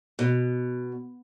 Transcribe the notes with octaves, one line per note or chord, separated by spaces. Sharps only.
B2